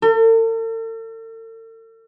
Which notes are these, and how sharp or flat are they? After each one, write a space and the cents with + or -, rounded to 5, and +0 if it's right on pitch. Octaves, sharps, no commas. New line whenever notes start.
A4 +45